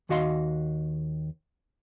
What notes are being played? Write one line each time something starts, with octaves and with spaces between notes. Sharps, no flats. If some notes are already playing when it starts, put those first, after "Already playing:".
D#2 D#3 F#4 D#5 F5 C6